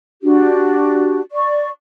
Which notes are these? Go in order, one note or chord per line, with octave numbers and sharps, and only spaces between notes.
D4 F#4 G4
D5 C#6